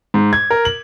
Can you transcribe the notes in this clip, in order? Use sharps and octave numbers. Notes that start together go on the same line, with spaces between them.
G#2
G#6
A#4
F#7